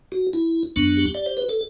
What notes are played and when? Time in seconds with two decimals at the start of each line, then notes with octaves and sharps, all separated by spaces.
0.12 F#4
0.33 E4
0.76 F#2 F#3 B3 D4
0.97 G4
1.14 D5
1.26 C5
1.37 B4
1.49 A4